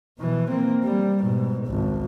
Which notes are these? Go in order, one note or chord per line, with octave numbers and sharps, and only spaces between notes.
B2 E3
A#3 C4
G3
G#2 B2
G#1 C#2